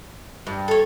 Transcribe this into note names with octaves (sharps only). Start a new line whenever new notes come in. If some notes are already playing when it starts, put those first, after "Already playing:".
G2
A4 C#5